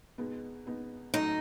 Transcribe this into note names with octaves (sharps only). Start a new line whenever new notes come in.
B2 G#3 B3 D#4
B2 G#3 B3 D#4
A2 F#3 A3 C#4 D#4